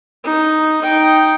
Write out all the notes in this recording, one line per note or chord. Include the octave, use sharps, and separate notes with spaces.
D#4
D#4 G5